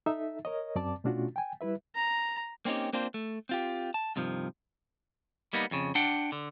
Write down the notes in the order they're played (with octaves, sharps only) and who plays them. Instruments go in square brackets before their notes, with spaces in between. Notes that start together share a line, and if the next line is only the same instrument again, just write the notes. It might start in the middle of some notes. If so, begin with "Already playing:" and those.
[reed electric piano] D#4 A4 E5
A#4 C#5 D#5
F#2 C4 D5 A5 D6
B2 A3 C#4 D4 F4 F#4
G5 G#5
G3 E4 B4 E5
[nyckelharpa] A#5
[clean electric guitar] A#3 C4 C#4 D#4 G4
A#3 C4 D4 F4 C5
A3
C4 F4 G4
A5
G2 C3 D#3 F3
G3 A#3 B3 D#4
F2 C#3
D4 F#5 G5
D3